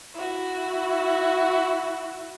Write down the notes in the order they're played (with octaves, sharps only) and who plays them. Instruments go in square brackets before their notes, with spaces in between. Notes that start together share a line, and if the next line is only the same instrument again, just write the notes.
[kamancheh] E4 F#4